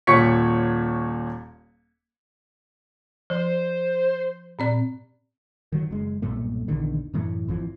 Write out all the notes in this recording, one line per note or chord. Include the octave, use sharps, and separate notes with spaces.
D#1 A#2 C#5 C#6 B6 C#7
F3 C5
A#2 C4 D5
D#3 F#3
F#1 G#3
B1 G2 A#2 A3
A#1 E2 D3 D#3
F#2 A2 E3 A3
G#1 F2 E3 F3